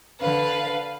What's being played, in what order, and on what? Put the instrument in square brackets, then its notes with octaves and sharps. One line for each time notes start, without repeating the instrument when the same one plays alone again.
[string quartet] D3 B4 F5